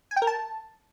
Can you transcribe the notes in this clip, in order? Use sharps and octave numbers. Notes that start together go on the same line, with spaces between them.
G#5
G5
A#4
A5